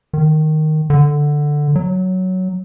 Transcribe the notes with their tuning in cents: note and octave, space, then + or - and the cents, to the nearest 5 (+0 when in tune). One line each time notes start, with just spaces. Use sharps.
D#3 -5
D3 +5
F#3 +5